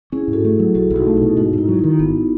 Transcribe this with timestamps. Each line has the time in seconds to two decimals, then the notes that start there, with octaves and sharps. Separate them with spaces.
0.12 C#4 E4 G#4
0.28 G#2
0.33 F#4 A4
0.44 A3
0.59 F#3
0.74 B1 F#4 A4
0.90 B1
0.96 D#4 F#4
1.06 A3
1.17 E4
1.22 B2
1.37 G#2 D#4 F#4
1.53 G#2 E4
1.68 F#3
1.79 D#4
1.84 D#3
1.99 G#1 B3